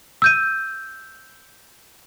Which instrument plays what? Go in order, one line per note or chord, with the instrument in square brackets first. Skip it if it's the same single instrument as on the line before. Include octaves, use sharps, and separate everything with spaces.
[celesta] E6 G6 D#7